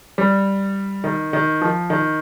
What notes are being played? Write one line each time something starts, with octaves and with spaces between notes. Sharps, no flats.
G3
D#3
D#3
F3
D#3